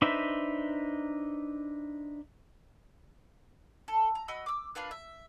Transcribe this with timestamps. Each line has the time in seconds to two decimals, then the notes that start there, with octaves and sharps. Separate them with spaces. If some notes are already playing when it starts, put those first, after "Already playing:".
0.02 D4 D#4 B4 C5 E5
3.88 A4
4.15 A#5
4.28 F#4 D#5 B5 E6
4.46 D6 E6
4.75 A#3 D4 F4 B4
4.91 E5